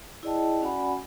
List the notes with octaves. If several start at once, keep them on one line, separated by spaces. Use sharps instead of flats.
E4 G#4 D5 D#5 G5 A5
C#4 F#4 D5 F#5 G#5 B5